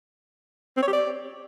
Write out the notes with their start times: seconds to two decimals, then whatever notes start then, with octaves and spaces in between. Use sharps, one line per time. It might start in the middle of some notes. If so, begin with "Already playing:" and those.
0.77 C4
0.82 C#5
0.88 G4
0.93 D5